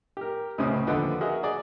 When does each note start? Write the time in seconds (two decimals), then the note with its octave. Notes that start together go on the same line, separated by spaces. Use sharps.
0.17 G4 A#4
0.58 C#2 A2 C3 C#4 C5 D#6
0.87 D#2 D3 F3 B4 D#5 F#5
1.21 F#4 G#4 A#4 D#5 E5 F#5
1.43 G#4 D5 D#5